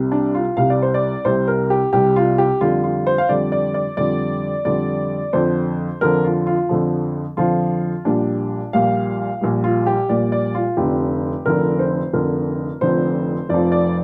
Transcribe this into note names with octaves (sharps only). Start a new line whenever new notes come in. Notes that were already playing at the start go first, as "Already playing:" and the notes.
Already playing: C2 C3 G3
D4
F4
C2 C3 G3 F5
D5
C5
D5
C2 C3 G3 C5
A#4
G4
C2 C3 G3 G4
F4
G4
F2 D3 G3 F4
F4
C5
F5
F2 D3 G3 D5
D5
D5
F2 D3 G3 D5
F2 D3 G3 D5
F2 D3 F3 C5
F2 D3 F3 A#4
F4
F4
F2 D3 F3
F2 D3 F3 F4
A#1 A#2 G3 D4
A#1 A#2 G3 F5
A#1 A#2 G3
F4
G4
A#1 A#2 G3 D5
D5
F4
F1 F2 D3 G4
F1 F2 D3 A#4
C5
F1 F2 D3 A#4
F1 F2 D3 C5
F1 F2 F3 D5
D5